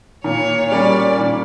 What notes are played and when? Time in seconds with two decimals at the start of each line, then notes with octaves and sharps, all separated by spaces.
0.24 A#2 C#5
0.72 G3 A#3 C#4 D5
1.19 A#2